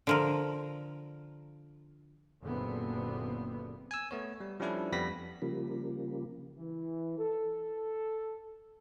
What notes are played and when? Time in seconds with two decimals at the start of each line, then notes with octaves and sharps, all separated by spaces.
0.07 D3 F3 A#4
2.42 F#1 A#2 D3 B3 C4
3.91 G#5 E6
4.11 A3 B3 C#5
4.40 G3
4.60 F3 G3 C#4 D4 E4 A4
4.92 F2 G3 B3 B5 A#6 B6
5.42 C#3 F3 G3 A#3
6.58 E3
7.19 A4